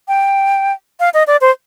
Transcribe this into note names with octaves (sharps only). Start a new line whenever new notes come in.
G5
F5
D#5
D5
C5